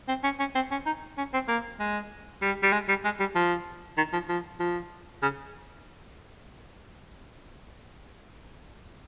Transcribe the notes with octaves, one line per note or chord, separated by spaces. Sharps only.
C4
C#4
C#4
C4
C#4
D#4
C#4
C4
A#3
G#3
G3
G3
G#3
G3
G#3
G3
F3
D#3
F3
F3
F3
C#3